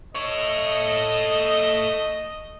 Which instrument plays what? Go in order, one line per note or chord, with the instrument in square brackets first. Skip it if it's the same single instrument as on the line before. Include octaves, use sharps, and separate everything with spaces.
[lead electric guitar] A4 C#5 [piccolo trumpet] D#5